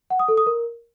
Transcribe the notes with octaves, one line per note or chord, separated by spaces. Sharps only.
F#5
D#6
A4
D#6
A#4